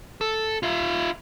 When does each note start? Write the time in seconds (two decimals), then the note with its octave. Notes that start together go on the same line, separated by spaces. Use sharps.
0.21 A4
0.63 F4 E5